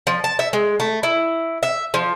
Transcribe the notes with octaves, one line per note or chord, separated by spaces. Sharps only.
F3
A5
E5
G#3
A3
E4
E5
F3